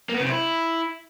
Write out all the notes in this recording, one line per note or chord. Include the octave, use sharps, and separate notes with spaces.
A#3
B3
C#3
C3
E4